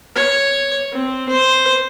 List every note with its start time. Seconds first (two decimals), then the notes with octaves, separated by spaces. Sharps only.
0.15 C#5
0.93 C4
1.29 C5